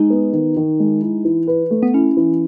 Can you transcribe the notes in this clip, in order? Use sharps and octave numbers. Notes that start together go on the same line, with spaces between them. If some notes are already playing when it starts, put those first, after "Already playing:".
Already playing: G#3 D#4
B3
D#3
D#3
G#3
E4
E3
B4
A3
B3
C#4 E4
E3